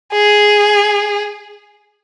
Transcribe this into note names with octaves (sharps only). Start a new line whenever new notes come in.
G#4